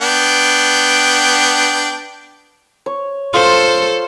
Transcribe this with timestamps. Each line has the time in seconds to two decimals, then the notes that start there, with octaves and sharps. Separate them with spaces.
0.01 B3 D4 G5
2.86 C#5
3.34 F4 A4 C5